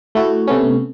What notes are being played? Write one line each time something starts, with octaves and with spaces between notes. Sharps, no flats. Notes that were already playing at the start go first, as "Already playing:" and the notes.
A3 E4 F#4
C3 A3 B3 C#4